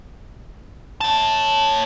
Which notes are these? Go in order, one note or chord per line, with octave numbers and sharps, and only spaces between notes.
C#5 A5